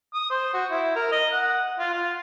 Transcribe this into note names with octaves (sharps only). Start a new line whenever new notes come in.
D#6
C5
F#4
E4
A#4
D#5
F#5
F4
F4